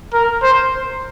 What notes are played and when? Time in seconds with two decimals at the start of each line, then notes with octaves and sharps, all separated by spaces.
0.14 A#4
0.43 C5